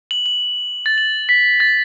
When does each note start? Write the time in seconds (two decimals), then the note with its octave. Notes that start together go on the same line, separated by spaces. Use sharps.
0.11 F#7
0.26 F#7
0.86 A6
0.98 F#7
1.29 B6
1.60 A6